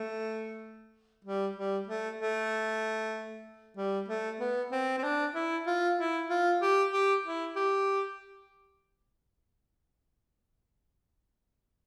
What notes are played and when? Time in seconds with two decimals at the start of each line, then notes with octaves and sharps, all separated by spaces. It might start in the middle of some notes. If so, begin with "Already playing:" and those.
Already playing: A3
1.25 G3
1.56 G3
1.87 A3
2.19 A3
3.77 G3
4.09 A3
4.40 B3
4.72 C4
4.98 C4
5.04 D4
5.35 E4
5.67 F4
5.98 E4
6.30 F4
6.62 G4
6.93 G4
7.25 E4
7.56 G4